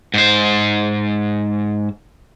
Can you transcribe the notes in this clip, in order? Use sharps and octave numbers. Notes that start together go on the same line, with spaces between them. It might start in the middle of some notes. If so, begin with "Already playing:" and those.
G#2 C5